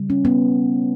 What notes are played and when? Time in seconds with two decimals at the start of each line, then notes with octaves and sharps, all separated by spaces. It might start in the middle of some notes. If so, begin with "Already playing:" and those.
Already playing: C#3 G3
0.10 C#4
0.25 B3